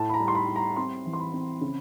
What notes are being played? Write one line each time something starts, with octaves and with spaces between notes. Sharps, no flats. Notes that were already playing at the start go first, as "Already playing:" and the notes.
Already playing: A2 A5
B5
A#5
G3
C6
B5
G3
A#5
C4 C6
E3
C6
B5
C4
C#3